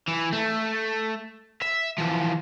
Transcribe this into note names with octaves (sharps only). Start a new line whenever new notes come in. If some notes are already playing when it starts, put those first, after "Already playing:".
E3
A3
E5
E3 F3